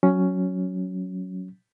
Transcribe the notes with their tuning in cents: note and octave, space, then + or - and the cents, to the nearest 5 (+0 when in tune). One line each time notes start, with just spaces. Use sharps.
F#3 +0 C#4 +5